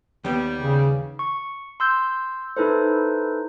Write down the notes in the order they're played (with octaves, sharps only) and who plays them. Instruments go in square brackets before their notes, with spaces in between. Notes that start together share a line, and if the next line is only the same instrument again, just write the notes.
[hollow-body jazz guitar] D#2 B3 [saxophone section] G3
[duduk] C#3
[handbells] C#6
C6 E6 G6
D#4 E4 A4 B4 C5